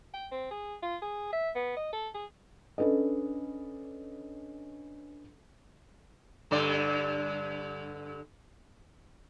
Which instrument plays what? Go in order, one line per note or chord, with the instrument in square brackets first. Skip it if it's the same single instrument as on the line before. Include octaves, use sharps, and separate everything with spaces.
[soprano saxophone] G5
C4
G#4
F4
G#4
E5
B3
D#5
A4
G#4
[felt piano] C#4 D4 A4 B4 D#5
[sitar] G2 D3 D5